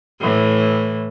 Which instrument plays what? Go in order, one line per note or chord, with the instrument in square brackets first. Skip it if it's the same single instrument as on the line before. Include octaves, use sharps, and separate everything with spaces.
[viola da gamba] A2 E3